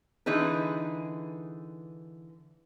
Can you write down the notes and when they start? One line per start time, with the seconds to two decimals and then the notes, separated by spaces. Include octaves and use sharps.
0.26 D3 E3 D#4 G#4 B4